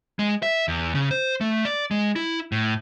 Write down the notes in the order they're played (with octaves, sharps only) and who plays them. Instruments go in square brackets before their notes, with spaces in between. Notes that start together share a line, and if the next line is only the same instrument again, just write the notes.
[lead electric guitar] G#3
E5
E2
C#3
C5
A3
D5
G#3
E4
A2